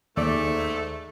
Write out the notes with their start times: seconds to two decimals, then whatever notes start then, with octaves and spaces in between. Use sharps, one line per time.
0.17 D#2 G#2 A3 D5